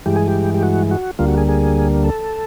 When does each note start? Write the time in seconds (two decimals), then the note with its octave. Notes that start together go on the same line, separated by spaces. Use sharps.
0.06 G2 E3 G#3 G4
0.16 G#4
0.28 G4
0.54 G4
0.63 F#4
0.91 F#4
1.19 D2 D3 G3 A#3 F4
1.28 F#4
1.38 G#4
1.48 G#4
2.04 A4